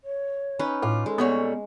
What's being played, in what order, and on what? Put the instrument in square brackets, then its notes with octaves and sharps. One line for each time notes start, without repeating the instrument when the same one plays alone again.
[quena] C#5
[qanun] C#4 D#4 B4
[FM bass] A2 [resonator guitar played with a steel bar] F4 [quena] D6
[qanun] G#3 [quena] A4
[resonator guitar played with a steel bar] A#2 G3 C#5 [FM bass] B3